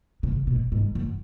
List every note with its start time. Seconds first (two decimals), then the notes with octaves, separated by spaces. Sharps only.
0.23 C#3
0.47 B2
0.72 G#2
0.95 F#2